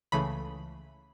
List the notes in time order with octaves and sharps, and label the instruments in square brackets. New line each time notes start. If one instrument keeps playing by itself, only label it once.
[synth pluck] C#2 C#3 E3 A3 B5